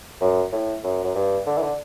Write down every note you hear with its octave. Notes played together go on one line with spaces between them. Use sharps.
F#2
A2
F#2
F#2
G2
D3
E3
D3